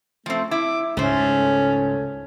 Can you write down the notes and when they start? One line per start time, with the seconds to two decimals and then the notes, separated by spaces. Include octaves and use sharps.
0.26 F3 A3 C4
0.51 E4 D6
0.97 C#2 G#2 A3 C#4 C5